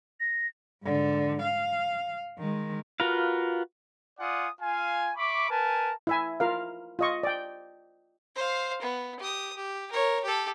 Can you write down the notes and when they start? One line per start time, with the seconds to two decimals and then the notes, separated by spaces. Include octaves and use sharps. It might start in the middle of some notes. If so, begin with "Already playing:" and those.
0.20 A#6
0.84 G#2 D3
1.42 F5
2.38 D#3 G#3
3.00 F4 F#4 A#4 B4 F5
4.20 F4 D5 F#5 G#5 D#6
4.61 F4 F5 G#5
5.17 E5 B5 C#6 D6
5.50 A#4 B4 G#5 A5
6.07 E4 E5 G#5
6.40 F4 A#4 F5
6.99 F4 D#5 C#6
7.23 D5 G5
8.36 C5 F5
8.81 B3
9.19 G4 D#6
9.56 G4
9.91 A#4 C#5
10.24 G4 A4